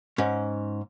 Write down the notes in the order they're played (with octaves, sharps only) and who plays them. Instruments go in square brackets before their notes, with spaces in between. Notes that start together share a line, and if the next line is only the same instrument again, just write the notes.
[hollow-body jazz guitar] G#2 C#4